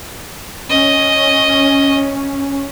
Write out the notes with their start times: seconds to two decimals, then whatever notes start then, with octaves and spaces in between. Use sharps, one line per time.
0.69 C#4 D#5